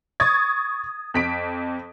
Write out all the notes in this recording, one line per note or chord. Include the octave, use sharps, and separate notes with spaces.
C#6 D#6 G#6 A6
F2 B6 D7